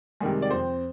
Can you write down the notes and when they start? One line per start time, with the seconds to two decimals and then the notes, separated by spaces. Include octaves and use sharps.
0.20 C3 D#3 G3 G#3 G#4
0.42 D5
0.50 F2 C4 C5